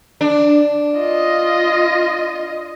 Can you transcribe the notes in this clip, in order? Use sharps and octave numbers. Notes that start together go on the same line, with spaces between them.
D4
F4 D#5